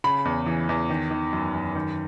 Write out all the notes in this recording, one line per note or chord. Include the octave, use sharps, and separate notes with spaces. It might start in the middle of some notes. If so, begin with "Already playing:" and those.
C#3 B5
E2
E3
E2
D#3
D#3
F#2
F#2
D#3